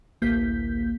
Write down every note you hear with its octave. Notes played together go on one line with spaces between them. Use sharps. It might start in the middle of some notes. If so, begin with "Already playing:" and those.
A1 D2 A#3 G6 B6